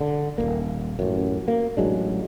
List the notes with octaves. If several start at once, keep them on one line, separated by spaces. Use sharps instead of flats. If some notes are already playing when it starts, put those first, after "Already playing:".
D3
D#1 G#1 A#3
A1 F#2
A#3
A1 F#3 G#3 D4